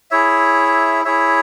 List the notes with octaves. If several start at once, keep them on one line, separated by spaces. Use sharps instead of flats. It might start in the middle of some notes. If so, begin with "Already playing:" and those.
E4 G#4 C#5 E5
E4 G#4 C#5 E5